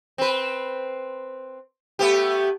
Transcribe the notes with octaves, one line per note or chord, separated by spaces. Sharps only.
C4 B4
A3 B3 G4